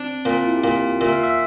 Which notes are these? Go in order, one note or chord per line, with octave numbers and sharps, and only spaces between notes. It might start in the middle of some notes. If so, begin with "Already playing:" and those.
Already playing: C4 D4
A#2 C4
E4
G4
A#2 F4
A#2 E5
F5
E5